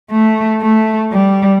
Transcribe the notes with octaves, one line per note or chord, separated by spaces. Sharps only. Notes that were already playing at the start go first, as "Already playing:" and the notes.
A3
A3
G3